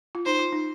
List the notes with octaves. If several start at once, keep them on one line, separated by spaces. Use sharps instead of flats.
F4
D#4 C5
F4
D#4